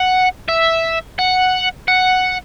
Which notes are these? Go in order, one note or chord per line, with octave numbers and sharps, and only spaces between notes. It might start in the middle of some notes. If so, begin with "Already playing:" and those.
Already playing: F#5
E5
F#5
F#5